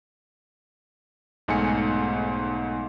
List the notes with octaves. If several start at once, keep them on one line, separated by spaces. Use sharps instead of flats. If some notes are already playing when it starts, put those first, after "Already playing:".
B1 G#2 A3 G#5 C#7